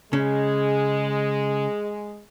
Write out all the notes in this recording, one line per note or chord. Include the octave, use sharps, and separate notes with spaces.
C#3 G#3 C#4